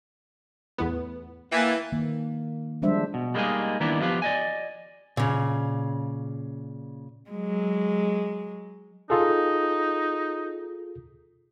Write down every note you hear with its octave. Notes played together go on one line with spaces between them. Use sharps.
E2 A2 B3
E3 A#3 G5 G#5 A6
D#3 A#3
F3 G3 G#3 D4 C5 E5
B2
G3 G#3 A#3 C4 D#4 G#4
D#3 E3 A#3 B3 D4 E4
F3 B3 G4 B4 F5
D5 D#5 G#5
A#2 C#3
F#3 G#3
D#4 F4 G#4 A4